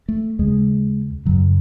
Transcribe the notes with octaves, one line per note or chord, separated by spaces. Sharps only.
A3
D#2 C#3 G#3
F#2 C#3 F#3